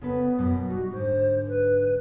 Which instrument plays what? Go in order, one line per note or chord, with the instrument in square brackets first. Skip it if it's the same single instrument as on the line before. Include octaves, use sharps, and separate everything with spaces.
[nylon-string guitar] C#3 A4 B4 [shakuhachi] B3
[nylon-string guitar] F#2 B2
[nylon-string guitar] G3 D#4 G#4 [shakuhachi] F#4
[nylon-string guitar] G#2 D3 [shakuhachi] C5
[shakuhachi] B4